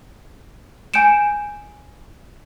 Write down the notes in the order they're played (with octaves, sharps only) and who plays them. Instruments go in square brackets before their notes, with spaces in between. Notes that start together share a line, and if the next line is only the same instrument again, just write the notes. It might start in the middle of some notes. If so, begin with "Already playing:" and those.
[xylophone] G#5 G6 C#7 D7 E7